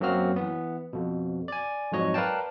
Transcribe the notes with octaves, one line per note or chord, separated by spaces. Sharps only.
F#2 F#3 A#3 C4 F#4 F6
E3 B3
F2 B2
D5 G#5
F2 G#2 F#3 C#5 D#5
A#4 B4 D5 F5 G5 A5